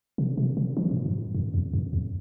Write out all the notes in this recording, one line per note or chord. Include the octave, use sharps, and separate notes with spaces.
C3
B2
C3
E3
A2
G2
F#2
E2
F#2
E2